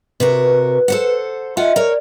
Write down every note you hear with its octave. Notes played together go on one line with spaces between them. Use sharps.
C3 F#4 A#4 B4
A4 C5 F#5
F4 D#5 E5 F#5 G#5
A#4 C#5 D5